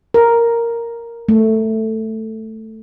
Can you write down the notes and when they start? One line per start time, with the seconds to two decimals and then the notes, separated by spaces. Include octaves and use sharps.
0.14 A#4
1.29 A3